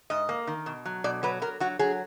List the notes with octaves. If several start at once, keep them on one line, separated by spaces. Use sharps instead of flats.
G#2 D#5
A#3
D#3
B2
F#3
B2 D5
F#3 B4
F#3 A#4
F#3 F#4
F#3 G#4